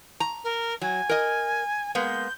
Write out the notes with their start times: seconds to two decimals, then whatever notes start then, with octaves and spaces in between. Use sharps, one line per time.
0.20 A#5
0.44 A#4
0.81 F#3 G#5
1.09 A#4 D#5
1.95 G#3 A#3 B3 G6